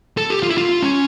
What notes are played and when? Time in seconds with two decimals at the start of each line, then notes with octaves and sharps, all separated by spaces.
0.17 A4
0.30 G4
0.43 F4
0.50 E4
0.57 F4
0.82 C#4